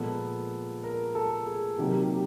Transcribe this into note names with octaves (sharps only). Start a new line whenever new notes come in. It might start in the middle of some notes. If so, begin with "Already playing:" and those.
Already playing: A#2 F3 G#3 B3 A4
A#4
A4
G#4
C3 D#3 F#3 A#3 D#4 G4
G4